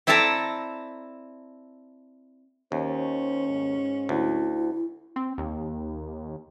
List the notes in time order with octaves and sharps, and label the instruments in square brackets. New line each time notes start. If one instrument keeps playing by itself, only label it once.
[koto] C4 E4 A4 D5 A5 A#5
[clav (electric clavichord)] D#2 [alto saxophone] C#4 [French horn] C5
[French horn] G#2
[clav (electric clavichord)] D2 [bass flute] E4
[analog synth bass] C4
D#2